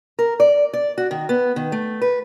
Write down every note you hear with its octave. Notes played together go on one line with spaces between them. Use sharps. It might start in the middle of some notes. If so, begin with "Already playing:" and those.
A#4
D5
D5
F#4
D#3
B3
D#3
A3
B4